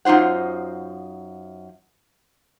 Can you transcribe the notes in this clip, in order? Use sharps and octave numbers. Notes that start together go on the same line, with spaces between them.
F#2 D#4 F4 C5 F#5